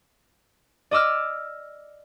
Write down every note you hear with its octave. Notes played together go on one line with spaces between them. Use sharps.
D5 D#5 D6 E6 F6